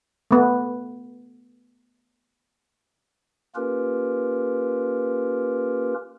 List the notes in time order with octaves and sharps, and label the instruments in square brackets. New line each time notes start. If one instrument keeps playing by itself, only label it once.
[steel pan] A3 B3
[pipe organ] A#3 C#4 F4 G4 A#4 B4